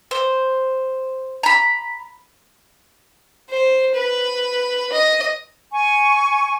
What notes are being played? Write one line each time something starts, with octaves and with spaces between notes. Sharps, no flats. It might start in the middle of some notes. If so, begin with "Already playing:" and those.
C5
A#5 B5
C5
B4
D#5
G#5 C#6